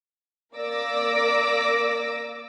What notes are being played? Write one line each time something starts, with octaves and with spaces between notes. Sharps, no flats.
A#3 A#4 D5 D6 E6 A#6